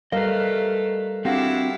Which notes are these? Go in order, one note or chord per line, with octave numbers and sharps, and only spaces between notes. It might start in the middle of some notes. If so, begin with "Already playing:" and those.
G3 A3 A#4 B4 D#5 F5
C4 D4 E4 F#4 G4 F5 F#5 A5